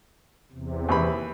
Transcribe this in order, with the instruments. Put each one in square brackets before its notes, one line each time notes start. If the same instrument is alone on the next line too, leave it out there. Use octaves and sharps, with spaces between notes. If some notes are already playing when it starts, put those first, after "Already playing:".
[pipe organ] E2 C3
[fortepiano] D#2 E3 B5